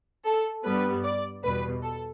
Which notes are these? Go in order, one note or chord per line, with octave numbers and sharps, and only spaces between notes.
A4
G2 G3 B3 B4
D5
E2 B2 G3 B4
A4